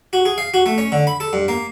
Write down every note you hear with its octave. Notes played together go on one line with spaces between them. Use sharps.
F#4
G#4
F5
F#4
A3
C#4
D3
B5
A4
G2
A#3